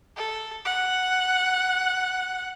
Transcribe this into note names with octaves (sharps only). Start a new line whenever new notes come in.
A4
F#5